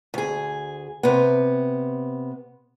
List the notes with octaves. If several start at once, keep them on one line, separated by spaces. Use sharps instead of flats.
D2 G#4
C3 B3